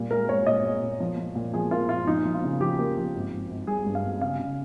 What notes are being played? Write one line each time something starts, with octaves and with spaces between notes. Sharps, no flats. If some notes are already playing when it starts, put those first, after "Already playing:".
Already playing: A#2 G3
G#3 A#4
G#3 C#5
A#2 D#5
G#3
A#2
F3
F3
A#2
F3 G#4
A#3 F4
A#2 F4
F3 D#4
F3
F4
C#3
F3 G4
A#3
F3
G#1
G#1
G#1
G3 G#4
G2
F5
G#1
C#3 F5
C#3